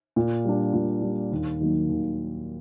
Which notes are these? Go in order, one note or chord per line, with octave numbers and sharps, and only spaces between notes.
A#2
G3 D4
A#2
G3 D4
D#2
D#3 F#3 A#3
D#2